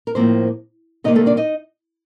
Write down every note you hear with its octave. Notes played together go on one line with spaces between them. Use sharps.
A#4
A2 F3 A#3 C4 C5
C3 D#3 G3 A#3 D#4 D#5
A3 A4
D4 D5
D#4 D#5